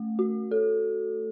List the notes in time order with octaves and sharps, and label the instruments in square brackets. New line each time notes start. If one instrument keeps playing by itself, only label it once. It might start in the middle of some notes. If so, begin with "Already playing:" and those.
Already playing: [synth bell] A3
F#4
A4